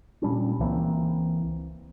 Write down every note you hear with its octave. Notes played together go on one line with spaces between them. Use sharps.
A#2 G3 C#4 D4
C#2 E3 A#3 C4